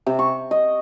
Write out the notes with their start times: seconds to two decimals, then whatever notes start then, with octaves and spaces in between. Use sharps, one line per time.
0.06 C3
0.19 C#6
0.51 D#5